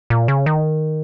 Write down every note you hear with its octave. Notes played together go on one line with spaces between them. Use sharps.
A#2
C#3
D#3